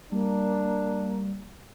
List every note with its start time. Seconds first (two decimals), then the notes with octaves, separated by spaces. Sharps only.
0.12 G3 A#3 D4